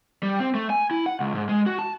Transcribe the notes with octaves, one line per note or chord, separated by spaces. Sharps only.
G3
C4
A3
G#5
E4
F#5
C#2
G#2
G#3
F#4
A5